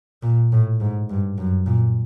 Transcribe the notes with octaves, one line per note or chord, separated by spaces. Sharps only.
A#2
A2
G#2
G2
F#2
A#2